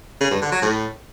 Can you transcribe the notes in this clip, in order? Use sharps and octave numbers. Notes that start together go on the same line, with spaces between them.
C#3
G2
D3
F#3
A2